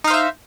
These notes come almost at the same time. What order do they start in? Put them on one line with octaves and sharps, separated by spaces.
D#4 F5 C5 E5